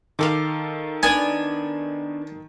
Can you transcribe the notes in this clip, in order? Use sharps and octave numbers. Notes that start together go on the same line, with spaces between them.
D#3 A4 F5 F#5 D6
B3 D4 D5 G#5